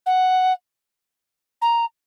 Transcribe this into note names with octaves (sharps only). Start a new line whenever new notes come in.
F#5
A#5